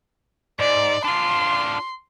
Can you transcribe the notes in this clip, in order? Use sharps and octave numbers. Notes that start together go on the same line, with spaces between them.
G#2 D5
D4 F4 C6